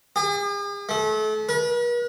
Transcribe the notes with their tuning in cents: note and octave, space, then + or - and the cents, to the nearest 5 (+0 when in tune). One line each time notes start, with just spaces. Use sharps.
G#4 -45
A3 -35
B4 -45